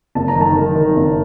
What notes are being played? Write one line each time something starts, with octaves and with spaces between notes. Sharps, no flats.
F#1 A5
A#5
D#3
A5
D#3
D#3
F#1